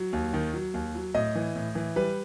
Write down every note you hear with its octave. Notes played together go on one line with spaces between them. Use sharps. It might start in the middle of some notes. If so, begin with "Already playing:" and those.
Already playing: F#3
D#2
D#3
F#3
D#2
F#3
A2 D#5
E3
A2
E3
G3 B4